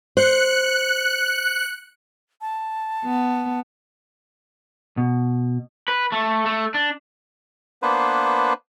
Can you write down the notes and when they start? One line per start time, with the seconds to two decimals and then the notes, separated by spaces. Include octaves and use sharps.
0.17 C5 F#6 C#7
2.41 A5
3.04 B3
4.97 B2
5.88 B4
6.12 A3
6.46 A3
6.74 D4
7.82 A#3 B3 D4 B4 C5